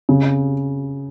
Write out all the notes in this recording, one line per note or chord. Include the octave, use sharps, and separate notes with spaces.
C#3